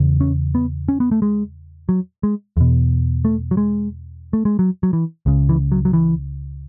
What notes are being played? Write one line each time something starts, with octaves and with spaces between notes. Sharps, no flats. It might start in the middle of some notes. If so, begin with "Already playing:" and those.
Already playing: E2 C#3
C#4
B3
C#4
B3
A3
G#3
F#3
G#3
E2 B2
A3
F#3
G#3
A3
G#3
F#3
F#3
E3
C#2 C#3
E3
F#3
F#3
E3